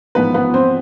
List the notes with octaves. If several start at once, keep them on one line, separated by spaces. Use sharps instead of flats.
A1 G#2 F3 B3 B4
B3 B4
C4 C5